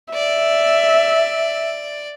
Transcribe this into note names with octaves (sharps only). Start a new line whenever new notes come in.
D5 E5